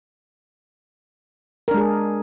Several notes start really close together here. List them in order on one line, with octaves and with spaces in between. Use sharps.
A#4 D4 G#3 G#4